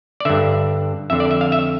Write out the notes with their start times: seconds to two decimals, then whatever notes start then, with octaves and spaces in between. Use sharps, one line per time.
0.20 D5
0.25 G2 D3 E5
1.10 F2 D3 E5
1.20 D5
1.31 E5
1.41 F5
1.52 E5